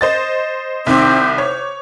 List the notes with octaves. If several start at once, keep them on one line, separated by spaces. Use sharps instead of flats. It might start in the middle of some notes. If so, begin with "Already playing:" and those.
C5 D#5 A6
C2 D#3 C4 D6
C5 C#5